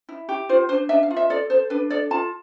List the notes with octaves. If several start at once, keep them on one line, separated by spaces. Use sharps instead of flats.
E4
G4
F4 C5
D4 C5
D4 E5
F5
F4
E5
A4 D5
A4 C5
D4 B4
A4 D5
F4 A5